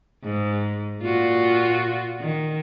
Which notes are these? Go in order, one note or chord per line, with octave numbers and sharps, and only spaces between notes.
G#2
A#2 F4 F#4
D#3